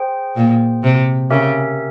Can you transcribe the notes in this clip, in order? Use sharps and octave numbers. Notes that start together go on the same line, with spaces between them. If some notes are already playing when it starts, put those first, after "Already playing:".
Already playing: G#4 C5 G5
A#2
C3
C#3 G4 A#4 E5 G#5